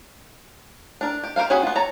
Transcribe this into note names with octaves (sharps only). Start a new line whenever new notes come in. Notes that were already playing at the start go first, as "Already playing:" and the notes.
D4 A#4
G4
G4 A#4 C5 F5
C#4 F#4 G#4 G#5 B5
B3 F4
A4 C#5 A5 A#5